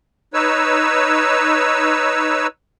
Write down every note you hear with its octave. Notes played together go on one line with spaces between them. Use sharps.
D#4 B4 C#5 E6